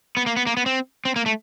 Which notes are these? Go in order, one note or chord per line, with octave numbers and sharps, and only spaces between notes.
B3
A#3
B3
A#3
B3
C4
C4
A#3
A3